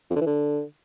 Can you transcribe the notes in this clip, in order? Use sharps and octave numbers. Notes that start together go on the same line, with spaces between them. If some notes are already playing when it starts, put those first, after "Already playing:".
F2
D3
E3
D3